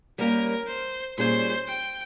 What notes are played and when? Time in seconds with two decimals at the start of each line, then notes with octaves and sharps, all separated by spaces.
0.18 G3 A#3 C#4 G4 A#4
0.68 C5
1.18 A#2 G3 C#4 G#4 C5
1.68 G5